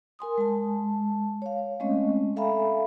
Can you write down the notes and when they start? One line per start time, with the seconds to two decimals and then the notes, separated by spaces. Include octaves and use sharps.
0.19 A#4 G#5 C6 D#6
0.38 G#3 A5
1.42 C#5 F5
1.80 G#3 A3 C4 C#4 D#5
2.36 A4 E5 F5 G#5 A#5 B5